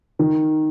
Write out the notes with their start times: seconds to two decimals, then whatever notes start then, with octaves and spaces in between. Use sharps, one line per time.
0.19 D#3